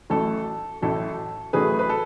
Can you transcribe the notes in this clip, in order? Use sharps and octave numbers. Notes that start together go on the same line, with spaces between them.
A1 A2 F#3 A3 A4
A1 A2 F#3 A3 A4
A1 A2 F#3 A3 G#4 B4
B4
A4